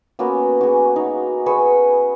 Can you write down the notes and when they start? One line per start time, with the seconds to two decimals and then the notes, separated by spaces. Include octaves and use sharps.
0.19 A#3 B3 C#4 F#4
0.61 F#4 G#4
0.96 D#4
1.46 G#4 B4 C#6 E6